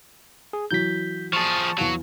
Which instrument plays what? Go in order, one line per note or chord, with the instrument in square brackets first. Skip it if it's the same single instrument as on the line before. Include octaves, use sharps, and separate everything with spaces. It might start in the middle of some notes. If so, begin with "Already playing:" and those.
[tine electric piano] G#4
[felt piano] E3 F#3 E4 [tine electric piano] G6 B6
[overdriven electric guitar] F3 G#4 [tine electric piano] A5 C#6
[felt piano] E2 E4 F5 [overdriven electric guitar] F#3 F#4